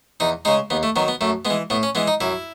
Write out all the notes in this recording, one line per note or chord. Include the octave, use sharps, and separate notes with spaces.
E2 D#4
C#3 G#3 D#4
D#2 B3
A3
D#3 F#3 B3
B3
F#2 A3
G#3 B3
E3
A2 B3
C#4
E3 G#3 B3
D#4
F#2 E4